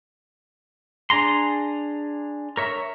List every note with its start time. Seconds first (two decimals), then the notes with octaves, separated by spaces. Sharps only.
1.10 D4 G#4 A#5 C6
2.57 A#4 C#5 E5